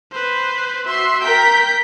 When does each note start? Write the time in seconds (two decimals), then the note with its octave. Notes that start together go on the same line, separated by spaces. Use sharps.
0.12 B4 C5
0.87 F#4 E5 C6
1.23 A#4 G5 G6 B6